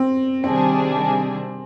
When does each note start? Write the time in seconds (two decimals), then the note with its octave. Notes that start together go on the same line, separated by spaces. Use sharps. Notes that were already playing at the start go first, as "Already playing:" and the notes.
Already playing: C4
0.43 C3 D#3 G3 C4 D4 G#4